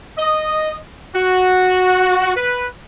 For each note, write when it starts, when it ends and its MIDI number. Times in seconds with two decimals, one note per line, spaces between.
0.18 0.77 75
1.15 2.33 66
2.37 2.67 71